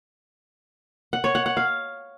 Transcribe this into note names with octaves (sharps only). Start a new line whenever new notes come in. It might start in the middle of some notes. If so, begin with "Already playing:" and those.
F#5
C#5
F#5
F#5
F5